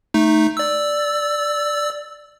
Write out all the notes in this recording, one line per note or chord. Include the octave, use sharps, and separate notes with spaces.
A3 D#4
D5 E6